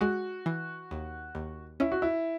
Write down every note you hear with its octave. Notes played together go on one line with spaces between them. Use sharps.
G#3 F#4
E3
D#2
D#2
C#4 E4
F#4
E4